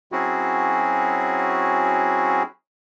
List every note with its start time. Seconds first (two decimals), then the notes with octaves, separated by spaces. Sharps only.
0.12 F#3 C4 C#4 E4 F#4 G#4